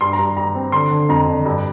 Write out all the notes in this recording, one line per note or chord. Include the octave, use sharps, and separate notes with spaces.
G2 C6
A#5
G2
G2 A#5
C4
D3 C6
D3
F2 A#5
D3
G2